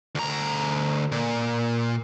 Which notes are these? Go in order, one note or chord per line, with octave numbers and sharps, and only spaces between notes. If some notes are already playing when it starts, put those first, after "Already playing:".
D2 A#5
A#2